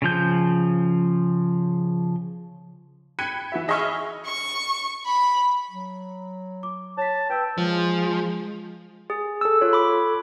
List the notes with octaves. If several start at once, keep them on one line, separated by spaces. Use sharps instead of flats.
C#3 F3 G6
G5 B5 F#6 G#6 C#7 D#7
E3 F#4 E5
G#4 D#5 E5 B5 C#6 F6
C#6
B5
F#3
D6
C#5 A5 B6
B4 G5 E6
F3 G#3
G#4
A4 E6
F4 C#5
B5 D6